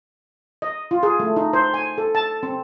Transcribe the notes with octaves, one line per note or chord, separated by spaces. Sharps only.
D#5
F4
G#4
A3
D#4
C5
G#5
A4
A5
C4